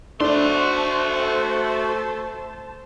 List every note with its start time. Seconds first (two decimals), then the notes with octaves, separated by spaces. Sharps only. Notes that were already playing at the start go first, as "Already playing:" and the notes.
0.20 A3 D4 F#4 C5 A5 C6